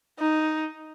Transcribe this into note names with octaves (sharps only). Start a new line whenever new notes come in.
D#4